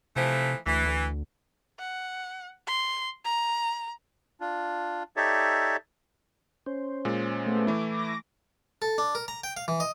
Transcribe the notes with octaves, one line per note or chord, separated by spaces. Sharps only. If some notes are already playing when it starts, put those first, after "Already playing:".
C3 E3 F3 A3
D2 E3
D2
F#5
C6
A#5
D4 F4
D#4 G4 A4 C#5 D5 E5
C#4 C5
A#2 G#3
A3 B3
E3 A3 E4 D6
D6 A#6
A4
D4
A#4
A#5
G5
F5
E3
D#5